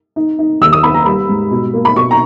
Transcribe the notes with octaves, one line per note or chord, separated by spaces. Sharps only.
D#4
D#4
D#2 E6
D#6
B3 B5
A#5
G3 B5
G#2
B2
A#3
B5
B2 C#6
A#5